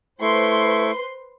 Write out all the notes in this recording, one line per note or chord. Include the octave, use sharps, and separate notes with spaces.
A3 E4 B4 C5 C6 C#6